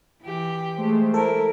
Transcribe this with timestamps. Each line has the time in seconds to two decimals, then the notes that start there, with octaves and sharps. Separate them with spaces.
0.22 E3 G4
0.77 G#3 A3 C5
1.14 E4 A4 A#4